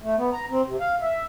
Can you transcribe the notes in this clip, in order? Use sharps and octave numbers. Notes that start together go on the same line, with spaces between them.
A3
B3
A#5
C4
C3
F5
E5